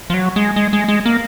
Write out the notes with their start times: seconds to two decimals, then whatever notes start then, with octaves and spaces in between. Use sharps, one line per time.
0.10 F3
0.14 F#3
0.36 G#3
0.56 G#3
0.73 G#3
0.88 G#3
1.06 A#3